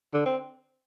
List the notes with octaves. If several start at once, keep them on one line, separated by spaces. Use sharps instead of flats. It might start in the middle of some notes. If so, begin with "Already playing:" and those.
D3
C4